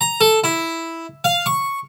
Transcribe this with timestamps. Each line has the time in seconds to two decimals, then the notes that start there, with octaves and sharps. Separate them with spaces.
0.01 A#5
0.21 A4
0.44 E4
1.24 F5
1.46 C#6